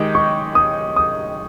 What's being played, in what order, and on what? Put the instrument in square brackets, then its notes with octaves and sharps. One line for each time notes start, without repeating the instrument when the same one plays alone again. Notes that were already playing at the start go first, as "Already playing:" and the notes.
Already playing: [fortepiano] D#3 G#3 D#4 G4
[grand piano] C#6
D#6
D#6